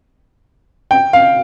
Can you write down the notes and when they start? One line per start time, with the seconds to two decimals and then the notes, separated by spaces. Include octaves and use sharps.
0.91 G5
1.13 F5